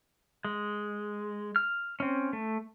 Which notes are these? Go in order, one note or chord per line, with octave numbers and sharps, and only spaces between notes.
G#3
F6
C4 C#4
A3